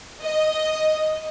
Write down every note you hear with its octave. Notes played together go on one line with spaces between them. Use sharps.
D#5